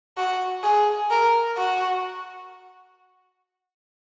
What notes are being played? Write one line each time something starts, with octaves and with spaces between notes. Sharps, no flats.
F#4
G#4
A#4
F#4